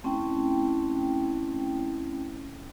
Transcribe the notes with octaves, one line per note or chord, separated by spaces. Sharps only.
A3 C4 C#4 E4 G5